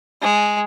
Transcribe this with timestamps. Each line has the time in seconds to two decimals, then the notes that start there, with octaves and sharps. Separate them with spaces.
0.22 G#3